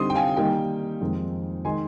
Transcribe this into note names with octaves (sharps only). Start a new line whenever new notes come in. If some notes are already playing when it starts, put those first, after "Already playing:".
Already playing: D3 G3 C4 D#4 C6 D#6
G5
F5 G#5
D#3 G3 A#3 D#4 G5
F2 D#3 G#3 C4 D#4
D#3 G#3 D#4 G#5 C6